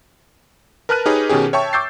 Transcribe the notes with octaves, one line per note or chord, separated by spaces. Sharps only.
A#4 B4 A5 F6 F#6 D#7
D#4 G4 G#4 B4 C#5 D#5
B2 D#3 C#4 G4 G#4
C#5 E5 G5 A5 C#6
C#6 D6 E6 G6 A6 C7